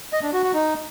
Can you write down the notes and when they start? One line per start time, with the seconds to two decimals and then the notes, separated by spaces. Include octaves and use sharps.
0.13 D#5
0.23 D4
0.33 F#4
0.43 F#4
0.54 D#4